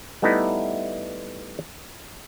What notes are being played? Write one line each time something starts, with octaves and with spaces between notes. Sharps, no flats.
G3 A3 B3 D#4 E4